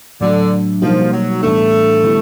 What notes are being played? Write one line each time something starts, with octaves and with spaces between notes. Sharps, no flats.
A2 D3 F#3 A3 D4
B2 F3 G3 A#3 D#4 F#4
F#3
A2 E3 G3 A3 B3 D4
D3 G3 B3 E4